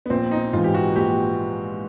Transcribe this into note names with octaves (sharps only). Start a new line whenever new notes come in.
B3
A#1 C4
D#4
G#2 E3 F4
G4
F#4
A#1 G4